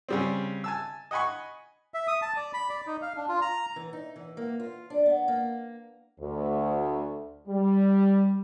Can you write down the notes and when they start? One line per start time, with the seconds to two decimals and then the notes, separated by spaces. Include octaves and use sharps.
0.09 C#3 G3 C4
0.64 G#5 A5 E6
1.11 D#5 F#5 G#5 B5 C#6
1.94 E5
2.07 D#6
2.22 A5
2.36 D5
2.54 B5
2.69 D5
2.87 D#4
3.02 F5
3.16 D4
3.29 F4
3.42 A#5
3.76 E3
3.93 D#4
4.16 E3
4.37 A#3
4.60 F4
4.90 D4
5.06 B3
5.28 A#3
6.21 D2
7.48 G3